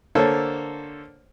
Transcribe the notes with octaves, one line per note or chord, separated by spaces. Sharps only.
D3 A#3 A4 C5 C#5